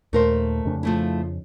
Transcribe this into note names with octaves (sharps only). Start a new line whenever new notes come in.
D#2 A#2 A3 A#4 C5
F2 C#3 D4
F3 A3 E4